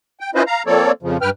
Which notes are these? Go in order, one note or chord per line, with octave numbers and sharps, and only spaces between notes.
G5
C#4 E4 F4 B4 C5 D#5
F5 A#5
F3 A#3 C4 A4 C#5 D5
F2 C#3 F3
G2 B4 G5 F6